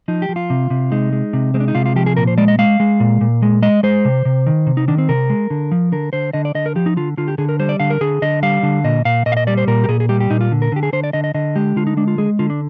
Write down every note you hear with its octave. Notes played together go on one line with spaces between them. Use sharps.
F3 D#4
G4
F3
F4
C3
C3
G#3 D#4
G#3
C3
G#3 C4
D4
D#4
C3 F4
F4
F3 G4
G#4
A#2 A#4
C5
G#3 D5
D#5
G#3 F5
G#3
A#2
A#2
G#3
G#3 D#5
G#3 C5
C3
C3
D#3
C3
D#4
D#3 D4
C4
C3 A#4
G#3
D3
F3
D3 A#4
D3 C5
D3 D#5
D5
D3 D#5
A#4
F3 G4
D#4
D3 F4
D3 F4
G4
D3 G#4
A#4
G3 C5
D5
D3 F5
A#4
D3 G#4
D3 D#5
G3 F5
D3
A#2 D#5
A#2 F5
A#2 D#5
F5
D#5
G3 D5
C5
A#2 A#4
G4
A#2 G#4
G#4
G3 G4
G4
A#2 D#4
F4
D3
A#4
D3 G4
G#4
D3 C5
D5
D3 D#5
D#5
D3 D#5
G#3 G4
D3 F4
D#4
G#3 D4
F4
G#3 G#4
D3 F4
D4